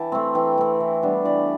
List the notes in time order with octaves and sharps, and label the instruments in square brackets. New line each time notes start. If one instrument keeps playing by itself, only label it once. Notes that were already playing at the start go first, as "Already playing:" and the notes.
Already playing: [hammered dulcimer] E3 G5 A5
A3 C4
E3 G5
A3 C4
E3
G3 B3 D4
E3 D5